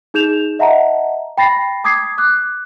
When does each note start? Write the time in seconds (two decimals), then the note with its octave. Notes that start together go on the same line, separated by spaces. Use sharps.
0.14 D#4 G#4 G6 E7 F7
0.59 D#5 E5 F#5 A5 A#5
1.38 G5 B5 A6 A#6 C7
1.84 A5 D6 D#6 G#6 B6 C7
2.18 D6 F#6